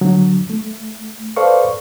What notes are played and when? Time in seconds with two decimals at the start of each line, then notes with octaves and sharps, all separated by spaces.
0.01 D3 F#3
0.50 A3
1.36 A4 B4 C5 D5 F5 C#6